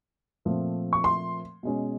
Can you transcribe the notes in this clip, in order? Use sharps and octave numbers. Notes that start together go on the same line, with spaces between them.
A#2 F3 A3 C4
C#6
C6
B2 G#3 C#4